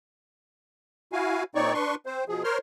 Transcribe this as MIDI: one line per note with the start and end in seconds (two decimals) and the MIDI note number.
1.13 1.43 64
1.13 1.43 66
1.13 1.43 77
1.13 1.43 80
1.55 1.74 46
1.55 1.74 60
1.55 1.74 63
1.55 1.74 73
1.55 1.74 74
1.55 1.74 85
1.74 1.95 62
1.74 1.95 71
1.74 1.95 84
1.74 1.95 85
2.06 2.24 60
2.06 2.24 72
2.29 2.43 47
2.29 2.43 53
2.29 2.43 68
2.44 2.58 70
2.44 2.58 72
2.44 2.58 73
2.44 2.58 84
2.44 2.58 89